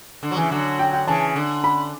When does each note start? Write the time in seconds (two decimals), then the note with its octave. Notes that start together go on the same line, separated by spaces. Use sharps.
0.23 D3
0.31 F#3
0.37 C#3 E3
0.51 D3 F#3
0.79 G5
0.93 G5
1.07 C#3 E3 A5
1.36 D3
1.64 B5